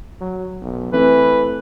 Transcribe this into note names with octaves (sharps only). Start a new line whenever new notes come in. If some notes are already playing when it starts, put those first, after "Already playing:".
F#3
B1
E3 A3 C4 A4 B4